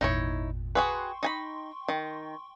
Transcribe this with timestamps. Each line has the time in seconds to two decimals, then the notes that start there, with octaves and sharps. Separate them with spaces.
0.01 G#1 E2 A#2 D#4 E4 C#5
0.75 F#4 G#4 B4 G5 C6 C#6
1.23 D#4 G#5 B5
1.88 D#3